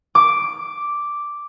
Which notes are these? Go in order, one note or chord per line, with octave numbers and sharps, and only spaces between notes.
D6